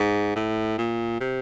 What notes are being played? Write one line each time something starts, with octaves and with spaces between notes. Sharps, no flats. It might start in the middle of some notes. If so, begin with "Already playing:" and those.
Already playing: G#2
A2
A#2
C3